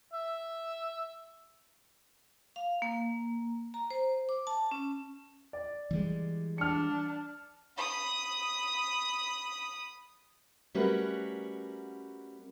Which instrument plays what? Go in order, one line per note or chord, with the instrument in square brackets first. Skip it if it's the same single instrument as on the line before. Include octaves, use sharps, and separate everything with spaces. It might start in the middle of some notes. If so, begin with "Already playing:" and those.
[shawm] E5
[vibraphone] F5
A#3
A#5
C5
D6
A5
C#4
[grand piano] D5
[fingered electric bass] E3 G3 G#3
[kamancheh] D4 A5 [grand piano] F6 C#7
[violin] B5 D#6
[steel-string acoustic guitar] G3 A3 C#4 F#4 A#4 B4